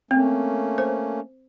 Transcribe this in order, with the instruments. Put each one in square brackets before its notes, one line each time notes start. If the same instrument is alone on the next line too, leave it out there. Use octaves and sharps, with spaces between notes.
[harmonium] A3 A#3 C#4 [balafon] C4
[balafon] C5